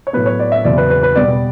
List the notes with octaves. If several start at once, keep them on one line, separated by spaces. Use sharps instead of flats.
C#5
A2 F#3 B3 B4
C#5
D5
E5
E2 C#3 F#3 B3 D5
B4
B4
B4
B2 G3 B3 D5